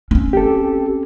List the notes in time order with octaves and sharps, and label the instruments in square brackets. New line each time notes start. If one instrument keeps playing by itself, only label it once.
[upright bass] C4 C#4
[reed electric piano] G4 A4